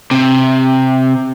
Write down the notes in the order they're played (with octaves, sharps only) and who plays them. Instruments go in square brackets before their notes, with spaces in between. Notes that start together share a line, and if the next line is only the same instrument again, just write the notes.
[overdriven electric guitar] C3